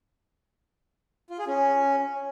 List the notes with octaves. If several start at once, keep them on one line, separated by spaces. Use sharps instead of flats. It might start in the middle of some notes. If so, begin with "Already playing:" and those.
F4
G#4
C#4